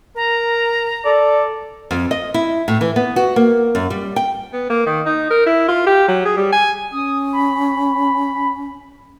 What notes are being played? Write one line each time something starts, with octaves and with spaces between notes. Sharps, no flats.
A#4 A#5
A4 D5
F2
D#5
E4
A2
E3
B3
F#4
A#3
F#2
G3
G5
B3
A#3
D#3
D#4
A#4
E4
F4
G4
F#3
G#4
G3
G#5
C#4 D#6
B5